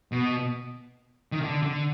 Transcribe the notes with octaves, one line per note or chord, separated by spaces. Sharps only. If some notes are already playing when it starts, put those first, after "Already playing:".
B2
D#3
D3
D3